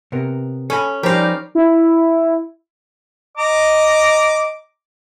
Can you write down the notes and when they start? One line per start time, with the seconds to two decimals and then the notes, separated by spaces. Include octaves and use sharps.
0.12 C3 B3 A#4
0.70 C#4 A4 G#5 B5
1.03 F3 G3 D#4 G4 A#4 C5 F5
1.55 E4
3.38 D#5 A#5 D6